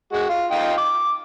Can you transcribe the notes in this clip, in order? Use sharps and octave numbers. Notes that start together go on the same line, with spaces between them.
G#3 F#4
F4
D#4 F4 G5
D6